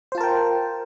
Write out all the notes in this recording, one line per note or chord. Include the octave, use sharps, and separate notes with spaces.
F4 A#4 C5 G5 A5